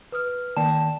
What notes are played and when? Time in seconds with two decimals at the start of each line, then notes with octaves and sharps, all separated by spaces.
0.12 B4 D#6 F6
0.57 D#3 A#3 D5 G5 A5